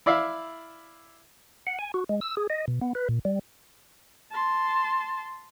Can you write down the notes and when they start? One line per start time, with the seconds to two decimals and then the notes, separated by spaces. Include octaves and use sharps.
0.06 E4 D5 E5 F5
1.67 F#5
1.79 G#5
1.94 F#4
2.09 G#3
2.21 E6
2.37 G#4
2.50 D#5
2.68 B2
2.82 B3
2.95 B4
3.09 A#2
3.25 G3
4.32 A5 C6